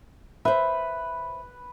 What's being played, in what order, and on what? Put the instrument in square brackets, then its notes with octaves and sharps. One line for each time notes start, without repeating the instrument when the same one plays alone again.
[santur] B4 [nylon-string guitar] C5 E5